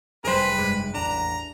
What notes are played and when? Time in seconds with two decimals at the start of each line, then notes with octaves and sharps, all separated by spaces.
0.25 F1 F#2 G3 G#4 B4 C5
0.56 G2 G#3
0.94 A1 E2 D4 A#5